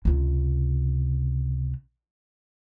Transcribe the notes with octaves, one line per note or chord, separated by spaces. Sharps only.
C#2 C3